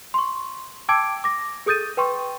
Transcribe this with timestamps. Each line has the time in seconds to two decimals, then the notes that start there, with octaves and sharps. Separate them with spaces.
0.14 C6 C#6
0.89 G5 A5 D6 E6 G#6 D7
1.24 D6 A#6
1.66 G#4 A4 D#6 G6 A6 D#7
1.97 B4 G5 C6 C#6